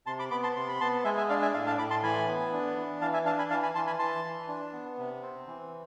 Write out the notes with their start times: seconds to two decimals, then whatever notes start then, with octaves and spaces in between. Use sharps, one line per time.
0.06 C3 A5 C6
0.19 B5 D6
0.31 B3 B5 D6
0.43 A5 C6
0.56 C3 C6
0.68 B5
0.80 B3 A5 C6
1.04 G#3 E5 G#5
1.17 E5 G#5
1.29 D4 D5 F5
1.42 E5 G#5
1.53 A2 D5 F5
1.67 F5 A5
1.78 A2 B5 D6
1.90 A5 C6
2.03 E3 G#5 B5
2.27 B3
2.53 D4
2.76 E3
3.01 E3 F5 A5
3.14 E5 G#5
3.25 D4 F5 A5
3.39 G#5 B5
3.50 E3 F5 A5
3.63 G#5 B5
3.75 E3 A5 C6
3.87 G#5 B5
3.99 E3 A5 C6
4.25 E3
4.48 D4
4.73 B3
4.98 C3
5.22 C4
5.47 E3